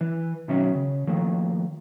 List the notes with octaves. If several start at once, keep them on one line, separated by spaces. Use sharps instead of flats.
E3 B4
B2 D#3 F#3 C#4 E5
C#3
D#3 F3 A3 A#3